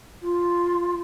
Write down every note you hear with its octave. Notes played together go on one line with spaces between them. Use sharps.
F4